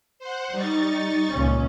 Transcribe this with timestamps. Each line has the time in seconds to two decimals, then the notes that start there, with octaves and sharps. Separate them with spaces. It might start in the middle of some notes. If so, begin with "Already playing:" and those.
0.19 C5 F#5
0.52 G3 D#4 C#6 A6
1.32 C#2 A#2 C#4